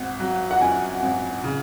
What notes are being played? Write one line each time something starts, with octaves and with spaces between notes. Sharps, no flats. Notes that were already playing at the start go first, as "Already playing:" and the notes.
Already playing: G#1 F#5
F#3
F#5
F#2 G#5
G#1
C#3